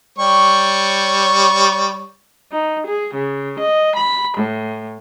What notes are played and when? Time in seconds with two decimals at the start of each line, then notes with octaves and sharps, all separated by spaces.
0.19 G3 C#5 C#6
2.52 D#4
2.87 G#4
3.16 C#3
3.60 D#5
3.95 B5
4.38 A2